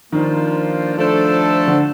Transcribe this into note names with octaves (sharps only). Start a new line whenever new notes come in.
D#3 F3 A#3 D4 F4 C5
F3 A3 D4 A4 C5
D3